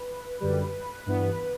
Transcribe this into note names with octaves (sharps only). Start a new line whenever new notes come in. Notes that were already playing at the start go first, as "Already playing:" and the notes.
Already playing: B4
F#2 D3 G3
G2 E3 B3